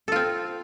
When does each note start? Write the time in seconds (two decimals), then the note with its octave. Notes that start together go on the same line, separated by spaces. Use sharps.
0.08 A4
0.12 F4
0.16 C4